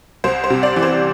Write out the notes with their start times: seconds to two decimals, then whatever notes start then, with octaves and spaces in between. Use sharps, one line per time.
0.24 C2 C5
0.44 C5
0.50 C3
0.63 D5
0.76 E3
0.82 C5